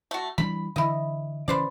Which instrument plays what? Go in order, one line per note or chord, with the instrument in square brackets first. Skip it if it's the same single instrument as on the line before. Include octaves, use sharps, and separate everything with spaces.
[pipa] A3 F#4
[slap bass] E3 G3 D4 [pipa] B5
[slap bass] D3 E3 [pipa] E4 D#5
[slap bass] C#3 E3 [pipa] B4 C5 D5